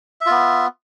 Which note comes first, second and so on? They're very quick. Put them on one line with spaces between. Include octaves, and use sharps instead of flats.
E5 F4 B3